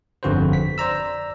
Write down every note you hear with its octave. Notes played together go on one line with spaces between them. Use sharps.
G1 F2 D3 F#4 B4 C5
B6
C5 D5 A#5 E6